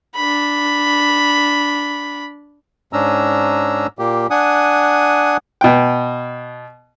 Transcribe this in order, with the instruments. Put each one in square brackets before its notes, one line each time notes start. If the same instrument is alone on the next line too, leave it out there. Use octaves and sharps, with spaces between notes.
[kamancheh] D4 B5
[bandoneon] G#2 C#4 D4 A#5 E6
A#2 A#3 G4
D4 F#5 G#5 D#6
[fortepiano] B2 G5